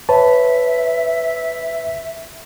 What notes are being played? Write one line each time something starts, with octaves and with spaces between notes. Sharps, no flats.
B4 C#5 E5 A5